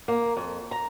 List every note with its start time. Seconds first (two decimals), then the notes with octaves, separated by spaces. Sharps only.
0.08 A#3
0.37 F2
0.71 A#5